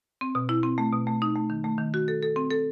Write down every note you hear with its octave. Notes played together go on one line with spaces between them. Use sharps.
C4
B2
E4
C4
A3
B2
A3
D#4
A3
D#3
A3
D#3
F#4
A4
A4
C4
A4